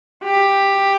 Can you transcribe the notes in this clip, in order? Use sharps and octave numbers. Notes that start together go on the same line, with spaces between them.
G4